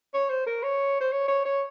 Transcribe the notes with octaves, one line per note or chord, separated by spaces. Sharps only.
C#5
C5
A#4
C#5
C5
C#5
C#5
C#5